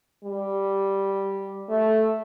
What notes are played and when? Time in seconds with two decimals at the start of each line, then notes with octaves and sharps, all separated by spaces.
0.24 G3
1.70 A3